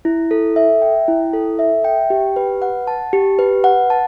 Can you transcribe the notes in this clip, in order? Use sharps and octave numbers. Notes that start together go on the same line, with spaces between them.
E4
A4
E5
G5
E4
A4
E5
G5
G4
B4
F#5
A5
G4
B4
F#5
A5